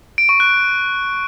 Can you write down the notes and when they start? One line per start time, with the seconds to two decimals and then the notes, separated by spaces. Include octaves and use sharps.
0.18 D7
0.29 C#6
0.40 F#6